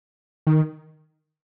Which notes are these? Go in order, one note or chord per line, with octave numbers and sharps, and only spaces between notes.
D#3